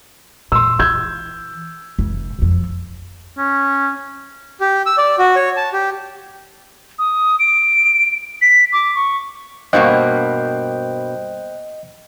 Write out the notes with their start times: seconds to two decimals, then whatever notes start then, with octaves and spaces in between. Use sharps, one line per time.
0.52 A#2 C6 E6
0.79 E3 E6 G6 G#6
1.99 F1
2.39 F#1 F2
3.38 C#4
4.60 G4
4.86 E6
4.98 D5
5.19 F#4
5.36 C#5
5.57 A5
5.73 G4
6.99 D#6
7.39 D7
8.42 B6
8.73 D6
8.95 C#6
9.73 G2 B2 A#3 C5 D#5 G5 F#6